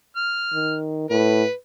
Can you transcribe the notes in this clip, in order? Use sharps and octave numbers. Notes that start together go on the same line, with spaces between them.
F6
D#3
A2 B4